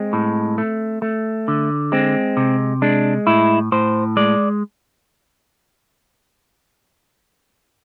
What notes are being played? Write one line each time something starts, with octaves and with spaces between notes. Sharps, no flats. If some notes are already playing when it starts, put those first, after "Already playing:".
Already playing: G#3 C4
A2
A3
A3
D3
G#3 C4
C3
G#3 D4
A2 E4
A2 C5
G#3 D5